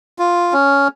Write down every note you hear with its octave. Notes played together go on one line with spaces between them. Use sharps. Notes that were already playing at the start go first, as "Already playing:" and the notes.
F4
C#4